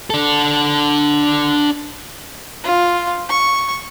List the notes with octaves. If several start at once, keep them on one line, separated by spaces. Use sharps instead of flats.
D4 A4
F4
C#6